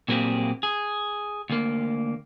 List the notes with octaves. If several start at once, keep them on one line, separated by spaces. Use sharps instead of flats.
A#2 F#3 A#3 C4 G4 G#4
G#4
D2 A#3